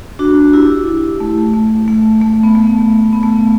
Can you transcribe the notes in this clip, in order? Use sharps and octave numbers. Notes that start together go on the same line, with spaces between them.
D4 F#4
E4 G4
A3
A3
A3
A3
B3
A3
B3
A3